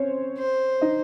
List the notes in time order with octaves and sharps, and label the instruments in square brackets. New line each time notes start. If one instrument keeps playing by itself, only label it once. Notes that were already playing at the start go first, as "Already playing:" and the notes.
Already playing: [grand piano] C4 C#4 C5 C#5
[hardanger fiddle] C5
[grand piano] D#4 D#5